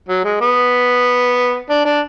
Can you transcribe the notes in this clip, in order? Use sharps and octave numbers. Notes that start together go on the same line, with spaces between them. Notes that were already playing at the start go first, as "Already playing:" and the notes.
F#3
G#3
B3
D4
D4